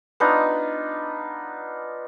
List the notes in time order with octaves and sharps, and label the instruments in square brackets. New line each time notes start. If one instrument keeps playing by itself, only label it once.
[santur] B3 D4 D#4 F4